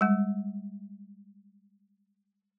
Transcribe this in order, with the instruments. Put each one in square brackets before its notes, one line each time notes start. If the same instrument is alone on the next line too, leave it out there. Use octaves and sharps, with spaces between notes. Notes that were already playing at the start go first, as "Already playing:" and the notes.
[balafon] G3 G#3